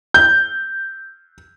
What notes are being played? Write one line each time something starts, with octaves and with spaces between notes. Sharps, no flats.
G6